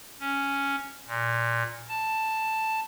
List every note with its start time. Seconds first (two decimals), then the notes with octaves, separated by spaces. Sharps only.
0.20 C#4
1.08 A#2
1.89 A5